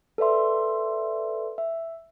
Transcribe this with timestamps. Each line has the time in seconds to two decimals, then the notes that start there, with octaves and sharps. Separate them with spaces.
0.18 A4 B4 D5 E5 C6
1.58 E5